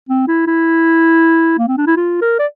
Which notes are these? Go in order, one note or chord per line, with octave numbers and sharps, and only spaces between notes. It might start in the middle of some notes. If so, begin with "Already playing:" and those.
C4
E4
E4
A#3
C4
D4
E4
F4
A#4
D5